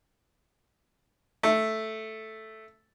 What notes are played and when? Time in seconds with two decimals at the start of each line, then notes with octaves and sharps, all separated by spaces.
1.43 A3